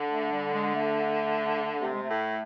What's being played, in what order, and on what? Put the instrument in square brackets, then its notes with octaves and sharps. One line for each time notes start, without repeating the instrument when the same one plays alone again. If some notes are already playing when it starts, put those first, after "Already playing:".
Already playing: [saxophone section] D3
[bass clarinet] A3
G3
G#3
A3
[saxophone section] C3 [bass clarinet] A3
[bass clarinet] G#3
A3
[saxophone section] A2